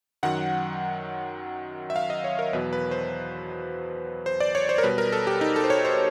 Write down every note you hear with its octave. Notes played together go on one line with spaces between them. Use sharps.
F#2 D#3 F#3 F#5
E5
F5
D#5
C#5
A#4
E2 B2 F#3 B4
B4
C5
C5
D5
C#5
C5
A#4
B2 G3 B4
A#4
A4
G4
D#4
A4
C5
C#5
C5